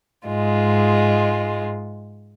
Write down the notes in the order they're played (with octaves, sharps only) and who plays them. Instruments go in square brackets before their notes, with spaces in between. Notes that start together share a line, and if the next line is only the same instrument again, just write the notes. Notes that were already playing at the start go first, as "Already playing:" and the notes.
[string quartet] G#2 G#3 F4